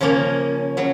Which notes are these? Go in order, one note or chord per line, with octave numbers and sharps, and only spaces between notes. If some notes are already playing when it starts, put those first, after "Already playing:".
C#3 F3 A#3 C#4
C#3 F#3